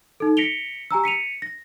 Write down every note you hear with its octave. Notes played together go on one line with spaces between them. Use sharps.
D#4 A4
A#6 B6 C#7 D7 F7 G7
G4 G#5 A#5 E6
B6 C#7 D#7 F7
A#6